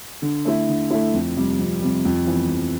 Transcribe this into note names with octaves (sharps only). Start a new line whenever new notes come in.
D3
A3 E4
D3
A3 E4
F2
C3 G3
F2
C3 G3
F2
E3 B3
F2